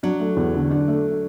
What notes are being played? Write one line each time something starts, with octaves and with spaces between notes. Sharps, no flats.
F#3 D4
A3
E2
D3
D4
A3